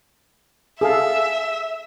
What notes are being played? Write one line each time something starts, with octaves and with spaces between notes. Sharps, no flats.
G#4 A4 E5 F5